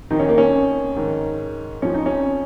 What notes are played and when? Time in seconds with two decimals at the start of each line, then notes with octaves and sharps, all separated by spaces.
0.11 F2 D#3 D#4
0.20 C#4
0.29 A#3
0.38 C#4
0.96 G#2 D#3
1.82 F2 F3 C#4
1.94 D#4
2.06 C#4